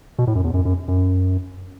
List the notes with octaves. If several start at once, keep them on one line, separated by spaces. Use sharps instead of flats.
B2
A2
F#2
E2
F#2
F#2
F#2